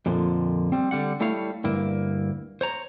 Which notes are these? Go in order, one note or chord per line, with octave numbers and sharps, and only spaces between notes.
F2 A#2 D3 F3
G3 C4
D3 G3 F#5
G3 A3 E4 C#5 F5
D2 G2 A#3 E4
C5 C#5 A#5